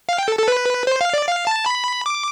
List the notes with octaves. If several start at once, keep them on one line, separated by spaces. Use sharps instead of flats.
F5
G5
A4
A4
B4
C5
F5
D5
F5
A5
B5
D6